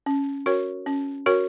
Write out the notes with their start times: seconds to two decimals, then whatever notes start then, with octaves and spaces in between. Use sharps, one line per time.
0.06 C#4
0.46 F#4 A#4 C#5
0.86 C#4
1.26 F#4 A#4 C#5